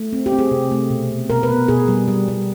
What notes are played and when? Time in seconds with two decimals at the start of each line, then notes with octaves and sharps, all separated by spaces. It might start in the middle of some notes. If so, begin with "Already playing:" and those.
Already playing: A3
0.13 C4
0.26 G4
0.32 C4
0.39 G#4
0.51 C3
0.71 A3
0.90 B2
1.10 B3
1.30 B2 A#4
1.43 B4
1.49 B3
1.68 B2 G#4
1.88 G3
2.08 G3
2.28 G3